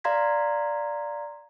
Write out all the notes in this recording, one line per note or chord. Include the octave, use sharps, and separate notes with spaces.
D5 F5 A#5 C6 G#6 B6